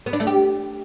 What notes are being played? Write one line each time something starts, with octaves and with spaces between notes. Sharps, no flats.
B3
D4
A3
G4